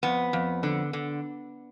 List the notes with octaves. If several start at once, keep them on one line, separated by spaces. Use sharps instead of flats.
F2 B3
F2
D3
D3